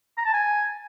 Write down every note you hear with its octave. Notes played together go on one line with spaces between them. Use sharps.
A#5
A5
G#5